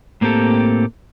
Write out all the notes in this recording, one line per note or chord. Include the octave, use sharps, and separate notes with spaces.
A2 A#3 C4 G4 A4